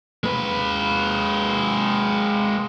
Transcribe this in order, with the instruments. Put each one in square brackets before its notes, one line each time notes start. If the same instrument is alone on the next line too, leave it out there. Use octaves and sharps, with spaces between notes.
[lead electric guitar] G#3 B4